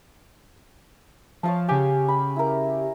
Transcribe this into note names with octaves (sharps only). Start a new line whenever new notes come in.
F3 C#5 F5 A5
C#3 G4 G#5
B5
E4 A#4